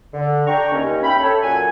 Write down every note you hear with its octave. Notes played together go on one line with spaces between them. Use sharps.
D3
D4 G5 A#5 C#6
D#2 C#4
E5 G5 B5
A4 C#5
F#2 A#2 G#4 F#5 G#5